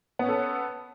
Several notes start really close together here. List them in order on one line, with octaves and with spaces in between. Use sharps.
B3 C#4 A4